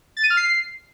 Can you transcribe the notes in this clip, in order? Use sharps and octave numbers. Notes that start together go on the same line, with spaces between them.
A6
D#7
F6
C7